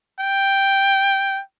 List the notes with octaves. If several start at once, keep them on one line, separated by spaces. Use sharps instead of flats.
G5